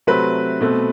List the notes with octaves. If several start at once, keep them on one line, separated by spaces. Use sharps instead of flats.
C3 F#3 A3 C4 B4
B2 A3 C4